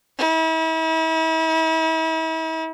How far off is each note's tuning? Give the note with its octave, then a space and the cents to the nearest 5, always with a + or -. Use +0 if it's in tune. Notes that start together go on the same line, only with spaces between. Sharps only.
E4 -40